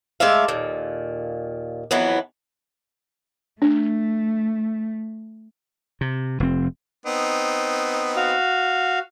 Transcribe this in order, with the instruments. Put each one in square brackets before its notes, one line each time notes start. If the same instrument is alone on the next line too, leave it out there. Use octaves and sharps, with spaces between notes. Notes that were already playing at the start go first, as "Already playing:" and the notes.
[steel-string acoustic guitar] G#3 A3 D5 E5 F5
D#2 A#2
F2 E3 F#3 B3
[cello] A3 [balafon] D4
[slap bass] C3
F1 C4
[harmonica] B3 C4 D#4
[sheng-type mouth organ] F#4 F5